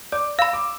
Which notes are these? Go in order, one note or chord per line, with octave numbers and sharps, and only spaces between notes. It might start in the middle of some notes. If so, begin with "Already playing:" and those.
D5 D6
F5 B5 E6
D6